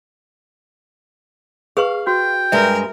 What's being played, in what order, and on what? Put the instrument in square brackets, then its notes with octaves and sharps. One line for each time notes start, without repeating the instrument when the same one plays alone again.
[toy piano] G#4 B4 C#6 [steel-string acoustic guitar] F5
[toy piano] F#4 [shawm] G5
[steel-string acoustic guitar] G2 G#3 [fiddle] A#4 [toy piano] E5